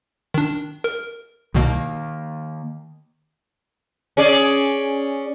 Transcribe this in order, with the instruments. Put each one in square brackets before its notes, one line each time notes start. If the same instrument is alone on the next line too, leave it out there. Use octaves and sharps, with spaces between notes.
[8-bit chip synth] D#3 D4
A#4
[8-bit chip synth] C2 B2 [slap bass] D#3 A#3
[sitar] C#4 G#4 D5